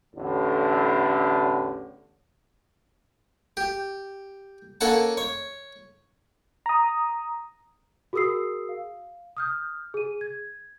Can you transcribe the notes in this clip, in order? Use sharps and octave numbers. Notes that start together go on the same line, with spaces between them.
A1 E2 A2 D3
G4
A#3 C#4 A4 F#5 A5
C#5
A#5 D#6
F#4 G#4 A#4 D#6 E6 C7
F5
D#6 F6 G6
G#4 D#7
G#6